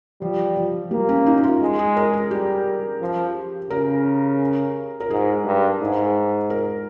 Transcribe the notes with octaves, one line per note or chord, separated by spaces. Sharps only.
F3 G3
F3
G3 A#3
C#4
D#4
D#4
F4
G#3
G#4
A#4
G#4
G3 G4
F3
C#3 A#4
A#4
G#2 G#4
G2
G#2
A#4